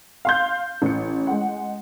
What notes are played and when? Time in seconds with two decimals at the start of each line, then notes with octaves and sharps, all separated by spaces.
0.25 F5 C6 G6
0.82 A1 C#7
1.27 G#3 F#5